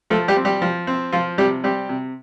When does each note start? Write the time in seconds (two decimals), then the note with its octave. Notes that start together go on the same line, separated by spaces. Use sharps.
0.10 F3 A3 A4
0.28 G3 G4
0.36 C4
0.45 G3 G4
0.62 F3
0.87 C4
1.12 F3 F4
1.38 C3 G3 G4
1.64 G3 C4 G4
1.89 C3